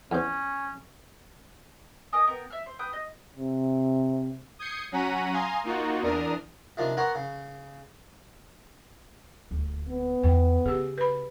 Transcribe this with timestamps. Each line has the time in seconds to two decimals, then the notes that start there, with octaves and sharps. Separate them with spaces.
0.11 E2 C#4 C5
2.13 A#4 D#5 G#5 D#6
2.27 B3 A#4 G5
2.50 E5 F6
2.66 C5
2.79 B4 G5 D#6 G6
2.93 D#5
3.37 C3
4.59 D#6 G6 G#6 C7 C#7
4.92 F#3 C#4 F#5 A#5 B6 D#7
5.33 F5 G#5 A#5 C6 D#6
5.64 A#3 D#4 F4 F#4
6.02 E2 D4 A#4 D#6 F6
6.77 C3 D#3 F3 D4 F4
6.97 B3 A#4 C5 C#5 F#5
7.15 C#3
9.51 D#1 D2
9.89 B3
10.23 E2 D#3 G5
10.66 C#3 G4 G#4
10.98 B4 B5